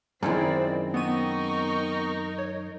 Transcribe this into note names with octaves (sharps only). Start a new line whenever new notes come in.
F#2 D#3 G#3 C4 E4 F4 D5
B3 C4 D#4 A#4 C#6 D#7
C#5